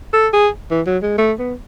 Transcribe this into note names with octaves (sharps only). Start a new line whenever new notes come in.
A4
G#4
E3
F#3
G#3
A3
B3